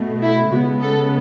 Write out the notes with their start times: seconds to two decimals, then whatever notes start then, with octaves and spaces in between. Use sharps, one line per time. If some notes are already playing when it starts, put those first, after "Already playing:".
Already playing: B2 A3
0.23 E4
0.52 C#3 G#3 B3 F#4
0.82 A4